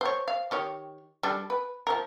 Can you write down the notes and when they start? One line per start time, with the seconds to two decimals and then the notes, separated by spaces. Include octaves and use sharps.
0.01 C5 C#5
0.28 F5
0.51 D#3 G4 C#5
1.23 G3 D4 A4
1.50 B4
1.87 F3 A#4